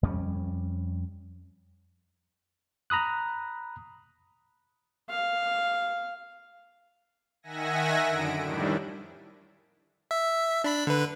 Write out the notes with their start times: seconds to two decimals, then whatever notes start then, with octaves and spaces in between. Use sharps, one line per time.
0.03 F2 G3 C#4
2.90 A#5 B5 D#6 F#6
5.10 F5
7.43 D#3 E5 F#5 G#5 A#6
8.06 F#2 D3 D7
8.42 F2 A2 D#3 G3 D4 E4
10.11 E5
10.64 D4 B5 B6
10.87 D3 B4